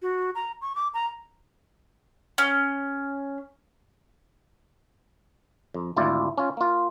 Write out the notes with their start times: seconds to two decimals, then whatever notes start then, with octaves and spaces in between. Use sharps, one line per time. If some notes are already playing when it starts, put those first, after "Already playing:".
0.02 F#4
0.35 A#5
0.62 C#6
0.75 D6
0.94 A#5
2.38 C#4
5.74 F2
5.96 G#1 D2 E4 F4 D5
6.38 C#4 F4
6.57 A#3 F4